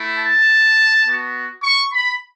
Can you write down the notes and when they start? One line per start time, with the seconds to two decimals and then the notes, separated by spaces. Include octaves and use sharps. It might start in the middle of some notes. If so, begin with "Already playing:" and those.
Already playing: A3 E4
0.16 A5
1.05 B3 F#4
1.63 C#6
1.93 B5